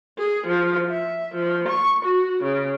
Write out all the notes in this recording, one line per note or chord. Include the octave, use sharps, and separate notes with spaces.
G#4
F3
E5
F3
C#6
F#4
C#3